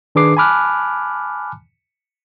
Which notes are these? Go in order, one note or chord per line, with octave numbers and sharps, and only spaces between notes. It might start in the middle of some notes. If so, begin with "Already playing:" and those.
D#3 D4 G#4 B4 D6 C7
G#5 A5 B5 D6 F6 F#6